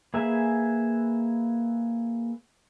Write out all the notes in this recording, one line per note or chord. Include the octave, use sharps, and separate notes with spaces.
A#3 G#4 B4 E5 G#5